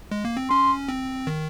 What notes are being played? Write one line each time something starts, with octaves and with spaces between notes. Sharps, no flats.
G#3
A#3
C4
C#4 C6
C4
D#3